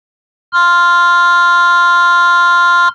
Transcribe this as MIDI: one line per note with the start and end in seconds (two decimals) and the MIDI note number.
0.53 2.88 84
0.53 2.88 89